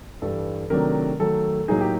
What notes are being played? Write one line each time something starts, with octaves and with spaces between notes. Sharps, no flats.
G2 E3 G3 A4
C3 D#3 F#3 A3 D4 A#4
D#3 F#3 A3 A4
A2 F#3 A#3 D#4 G#4
G4